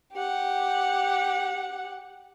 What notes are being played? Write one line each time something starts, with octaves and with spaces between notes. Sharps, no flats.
G4 F#5